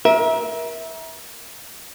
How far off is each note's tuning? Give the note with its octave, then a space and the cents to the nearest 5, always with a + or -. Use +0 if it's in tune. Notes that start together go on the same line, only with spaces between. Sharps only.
A#4 +30 E5 -20